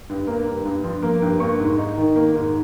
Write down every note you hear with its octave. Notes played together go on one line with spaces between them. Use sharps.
G2
A#3
G2
G2
F3
A#3
G2
A#3 C#6
G#2
D#4
D#3
A#3
G#2